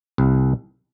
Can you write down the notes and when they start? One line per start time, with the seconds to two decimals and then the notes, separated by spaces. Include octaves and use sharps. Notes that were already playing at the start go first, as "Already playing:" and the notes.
0.18 C2